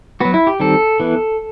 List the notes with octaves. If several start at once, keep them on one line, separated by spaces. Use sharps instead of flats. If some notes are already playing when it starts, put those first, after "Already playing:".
F#3 B3 F#4
E4
G4
D#3 G3 C4 A4
E3 B3